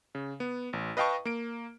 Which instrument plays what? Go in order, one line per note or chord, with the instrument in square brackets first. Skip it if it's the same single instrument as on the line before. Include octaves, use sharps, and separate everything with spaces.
[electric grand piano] C#3
B3
A1
B4 D#5 F5 G5 A5 C#6
A#3 D7